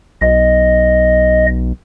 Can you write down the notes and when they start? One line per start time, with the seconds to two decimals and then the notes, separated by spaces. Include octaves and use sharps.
0.21 B1 D#5